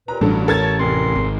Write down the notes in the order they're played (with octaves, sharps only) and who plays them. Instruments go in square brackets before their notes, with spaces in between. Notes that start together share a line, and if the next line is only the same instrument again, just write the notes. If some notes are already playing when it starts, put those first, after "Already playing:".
[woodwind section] D#2 A#2 B4 [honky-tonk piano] A#5
[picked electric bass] A1 [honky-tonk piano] G2 A4 [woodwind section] F#3
[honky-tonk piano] A4 G#6 A6 [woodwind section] A#4 C#5 A5
[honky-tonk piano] F1 [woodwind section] A#4 C6
[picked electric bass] G#1